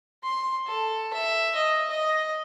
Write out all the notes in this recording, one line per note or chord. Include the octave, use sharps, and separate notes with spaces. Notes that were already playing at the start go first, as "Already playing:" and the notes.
C6
A4
E5
D#5
D#5